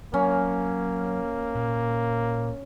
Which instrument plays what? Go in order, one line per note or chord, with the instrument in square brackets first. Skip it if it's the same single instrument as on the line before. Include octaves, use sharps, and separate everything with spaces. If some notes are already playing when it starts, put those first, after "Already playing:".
[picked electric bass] F#3 [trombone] A#3 [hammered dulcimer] C#4
[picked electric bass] A#2